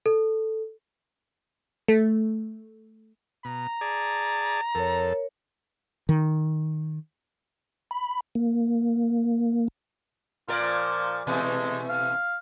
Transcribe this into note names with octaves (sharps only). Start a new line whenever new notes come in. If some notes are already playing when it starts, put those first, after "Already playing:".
A4
A3
B2 A#5
G#4 D5 A5
F2 A4 A#4 C#5
D#3
B5
A#3
A#2 F4 A#4 D5
F3
B2 E3 G#3 A3
F5